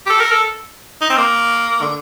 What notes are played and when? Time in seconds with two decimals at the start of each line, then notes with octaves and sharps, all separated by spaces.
0.06 G4
0.10 A4
0.20 A#4
0.31 A4
1.01 D#4
1.10 C4
1.17 A#3
1.81 D3